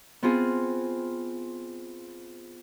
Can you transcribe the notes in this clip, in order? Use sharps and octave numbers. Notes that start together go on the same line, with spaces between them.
B3 C4 F4 G#4